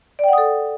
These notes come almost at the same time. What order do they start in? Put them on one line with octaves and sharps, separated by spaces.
D5 G5 F#5 D#6 A4